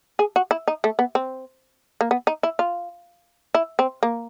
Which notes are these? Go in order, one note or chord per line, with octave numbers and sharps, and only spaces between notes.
G#4
F#4
E4
D#4
A3
B3
C4
A#3
B3
D#4
E4
F4
E4
C4
A#3